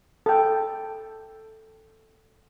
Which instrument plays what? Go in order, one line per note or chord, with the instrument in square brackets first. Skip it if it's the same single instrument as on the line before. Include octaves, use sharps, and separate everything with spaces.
[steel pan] A4 G5